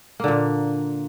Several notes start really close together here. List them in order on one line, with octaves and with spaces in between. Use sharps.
A#3 D3 A#2